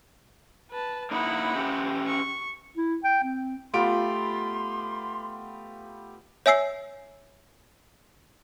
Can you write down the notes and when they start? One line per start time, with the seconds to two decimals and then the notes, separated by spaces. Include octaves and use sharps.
0.71 B4 A5
1.11 A#3 D#4 E4 F#5 B5
1.55 C#4 G4 E5
2.07 C#6
2.77 E4
3.04 G5
3.24 C4
3.74 A3 B3 F4 G4 C6 D7
6.46 C#5 E5 G#5 E6 C7